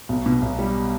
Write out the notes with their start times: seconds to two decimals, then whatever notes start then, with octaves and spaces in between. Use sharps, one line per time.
0.09 B1
0.26 B2
0.42 B1
0.59 G3